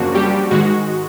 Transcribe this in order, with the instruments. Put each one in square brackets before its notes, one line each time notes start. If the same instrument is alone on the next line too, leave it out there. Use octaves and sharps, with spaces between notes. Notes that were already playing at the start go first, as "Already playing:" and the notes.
Already playing: [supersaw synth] F#2 C#3 F3 A#3 D4 F#4
G3 G4
G#2 D#3 G#3 F#4